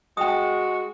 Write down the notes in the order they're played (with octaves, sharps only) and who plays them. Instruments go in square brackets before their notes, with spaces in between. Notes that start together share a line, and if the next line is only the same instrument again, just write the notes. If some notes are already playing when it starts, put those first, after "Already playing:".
[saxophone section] G#3 F#4 [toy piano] G5 D#6